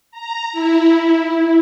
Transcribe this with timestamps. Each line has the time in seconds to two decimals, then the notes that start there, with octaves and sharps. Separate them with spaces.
0.11 A#5
0.52 E4